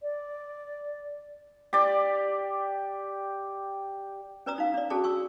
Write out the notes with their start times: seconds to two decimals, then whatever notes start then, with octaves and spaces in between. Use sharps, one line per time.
0.01 D5
1.73 G4 D5
4.46 C#4 B4 D5 A#5 D#6
4.58 D#4 F5
4.74 D4 D5
4.90 C#4 F#4 G#4 A4 D5 A5
5.04 G#5 C#6 E6